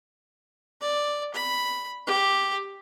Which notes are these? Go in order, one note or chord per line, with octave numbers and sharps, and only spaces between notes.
D5
B5
G4